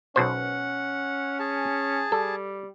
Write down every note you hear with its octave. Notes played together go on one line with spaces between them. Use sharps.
B1 B2 C#4 C5 F#5
G#4 A5
G3 A4